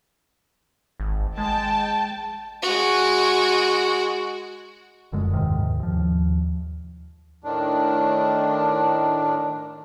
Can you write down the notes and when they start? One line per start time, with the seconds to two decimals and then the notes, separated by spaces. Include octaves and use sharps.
1.00 G#1
1.38 G#3 G5 A5
2.63 G#3 F#4
5.12 F1 F#2 D3 G#3
5.33 D#2 G#2 C3 D#3
5.80 D#2 F3
7.44 A2 D#3 D4